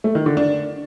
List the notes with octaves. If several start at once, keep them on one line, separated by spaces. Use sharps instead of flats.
A3
D#3
D3
D4